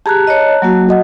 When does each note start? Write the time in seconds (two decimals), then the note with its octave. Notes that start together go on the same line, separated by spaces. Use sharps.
0.06 G4 G#4 A5 A#5 F#6
0.27 C#5 D#5
0.62 F#3 A#3 F#4
0.89 F#4 D#5 F#5